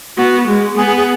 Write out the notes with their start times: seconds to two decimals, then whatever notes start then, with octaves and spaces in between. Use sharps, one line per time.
0.18 B3 F#4
0.47 G#3
0.77 B3 G#4
0.87 G#4
0.98 G#4